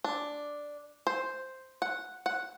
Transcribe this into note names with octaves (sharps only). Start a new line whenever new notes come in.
D4
C5
F#5
F#5